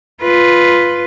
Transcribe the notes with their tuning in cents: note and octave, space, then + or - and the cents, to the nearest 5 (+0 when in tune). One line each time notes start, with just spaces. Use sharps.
F4 +0 B4 +0